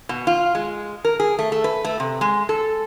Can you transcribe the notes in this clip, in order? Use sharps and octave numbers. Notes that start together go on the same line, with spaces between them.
B2
F4
G#3
A#4
G#4
A3
A3
B4
A3
C3
G#3
A4